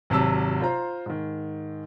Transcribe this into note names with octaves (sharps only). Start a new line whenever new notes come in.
G#1 C3 F#3 A5 E6
F4 C5 A#5
G#2 D#3